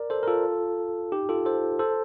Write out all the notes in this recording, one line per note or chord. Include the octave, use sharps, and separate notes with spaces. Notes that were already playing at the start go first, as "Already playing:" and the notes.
Already playing: A#4 D5
A4 C5
A#4
F4 A4
D#4 G4
F4 A4
A4 C5
A4 C5